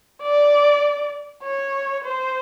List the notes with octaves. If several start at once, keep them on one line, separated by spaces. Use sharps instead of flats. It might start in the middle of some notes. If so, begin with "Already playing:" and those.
D5
C#5
C5